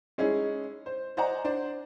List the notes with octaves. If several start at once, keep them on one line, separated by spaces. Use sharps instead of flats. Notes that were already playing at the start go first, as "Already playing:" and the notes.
G#3 C#4 D#4 E4 G#4
C5
C5 D5 D#5 F#5 G#5 A#5
D4 C5